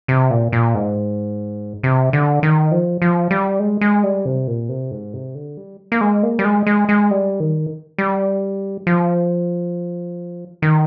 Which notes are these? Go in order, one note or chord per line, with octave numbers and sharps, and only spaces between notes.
C3
A#2
A#2
G#2
C3
D3
D#3
F3
F3
G3
G#3
G#3
G3
C3
A#2
C3
G#2
C3
D3
G3
A#3
G#3
A#3
G3
G#3
G#3
G#3
G3
D#3
G3
F3
D#3